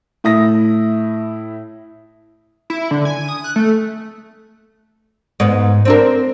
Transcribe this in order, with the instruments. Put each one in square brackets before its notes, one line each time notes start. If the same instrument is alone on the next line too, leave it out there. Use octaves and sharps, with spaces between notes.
[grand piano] A2 E4 D#6 A#6
[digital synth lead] E4
D3
G#5
D#6
F#6
A3
[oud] G#2 B3
C4 D4 A#4